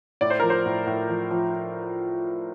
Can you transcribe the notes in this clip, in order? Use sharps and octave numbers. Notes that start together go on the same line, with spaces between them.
A2 D5
C5
F3 A#4
C5
A2
A2
F3
F3